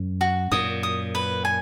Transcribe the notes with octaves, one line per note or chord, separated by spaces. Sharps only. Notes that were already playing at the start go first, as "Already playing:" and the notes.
Already playing: F#2
F#4
F#2 A#2 D#6
D#6
B4
G#5